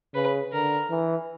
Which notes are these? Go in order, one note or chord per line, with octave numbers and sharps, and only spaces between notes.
C#3 B4
D3 A#4
E3